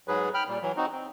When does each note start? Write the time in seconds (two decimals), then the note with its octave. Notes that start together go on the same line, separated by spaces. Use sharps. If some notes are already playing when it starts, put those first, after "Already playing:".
0.08 G#2 F#3 G#4 B4
0.34 G5 B5 F6
0.48 A#2 G3
0.62 E3 F#3
0.77 C4 D#4 F#4
0.92 C4